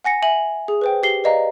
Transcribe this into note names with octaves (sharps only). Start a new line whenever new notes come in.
F#5 G#5 A#6 C#7
E5 G#5 F#7
G#4
B4 C5 G5
G4 C7 G7
B4 D5 D#5 F5 A#5